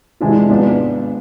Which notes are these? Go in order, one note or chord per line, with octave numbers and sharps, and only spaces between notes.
C3 E3 G#3 D4 F4
G#1 G#2 F3 B3 D4